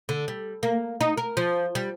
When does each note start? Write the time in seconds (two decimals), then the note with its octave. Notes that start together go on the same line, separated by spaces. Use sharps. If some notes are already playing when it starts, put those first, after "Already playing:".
0.09 D3
0.28 G3
0.63 A#3
1.01 D#4
1.17 A#4
1.37 F3
1.75 G3